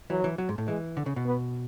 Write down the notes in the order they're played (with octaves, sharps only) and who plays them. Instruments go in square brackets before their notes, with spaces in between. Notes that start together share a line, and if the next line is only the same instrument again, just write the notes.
[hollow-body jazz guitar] E3 [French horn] F#3
[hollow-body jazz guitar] E3
F#3
G#2
A2
[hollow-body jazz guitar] E3 [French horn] G#3
[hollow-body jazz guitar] D3
C#3
B2
[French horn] B3